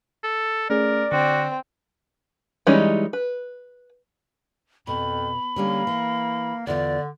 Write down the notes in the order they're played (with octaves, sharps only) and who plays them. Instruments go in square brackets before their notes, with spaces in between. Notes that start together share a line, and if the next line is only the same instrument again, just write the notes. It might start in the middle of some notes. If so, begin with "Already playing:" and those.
[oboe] A4
[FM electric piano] A3 C#4 G#4 [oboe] A#4 [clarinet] D5
[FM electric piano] D3 [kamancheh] C4 [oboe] F#4
[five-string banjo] E3 G3 G#3 C#4 D#4
B4
[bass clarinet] F2 [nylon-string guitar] B2 [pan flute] B5
[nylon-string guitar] D3 G3 C#4 [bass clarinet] A#3
[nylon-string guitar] E3
[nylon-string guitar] E2 F4 [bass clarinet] D3 [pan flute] D5